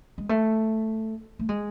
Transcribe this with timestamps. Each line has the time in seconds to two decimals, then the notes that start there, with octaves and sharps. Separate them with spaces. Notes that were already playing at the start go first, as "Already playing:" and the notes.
0.18 G#3
0.29 A3
1.39 A3
1.49 G#3